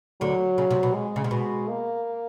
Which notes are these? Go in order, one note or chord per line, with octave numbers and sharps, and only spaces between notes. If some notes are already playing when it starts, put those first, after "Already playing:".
D2 D3 F#3
C#3
C3
B2
G#3
C#3
C3
B2
A#3